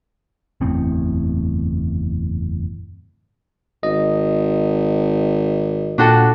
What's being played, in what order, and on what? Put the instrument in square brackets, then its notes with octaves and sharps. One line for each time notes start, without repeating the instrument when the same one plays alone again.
[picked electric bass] F#1 E2 A2 C4
[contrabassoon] G#1 [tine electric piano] D#5
[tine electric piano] A#2 G5 [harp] D4 F#4 A4